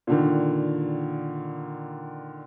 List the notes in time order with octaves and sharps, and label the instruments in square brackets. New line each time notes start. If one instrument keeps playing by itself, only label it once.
[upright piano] A#2 D3 D#3